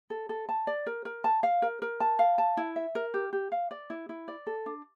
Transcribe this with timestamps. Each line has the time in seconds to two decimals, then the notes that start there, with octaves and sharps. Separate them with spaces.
0.10 A4
0.29 A4
0.49 A5
0.67 D5
0.87 A#4
1.05 A#4
1.24 A5
1.43 F5
1.62 A#4
1.82 A#4
2.00 A5
2.19 F5
2.38 A5
2.57 E4
2.76 E5
2.95 A#4
3.14 G4
3.33 G4
3.52 F5
3.71 D5
3.90 E4
4.09 E4
4.28 D5
4.47 A4
4.66 D4